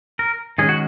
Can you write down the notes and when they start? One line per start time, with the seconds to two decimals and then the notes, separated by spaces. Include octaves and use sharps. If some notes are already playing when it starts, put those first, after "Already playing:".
0.19 A#4
0.58 D#3 G#3 C#4 G#4
0.69 F#4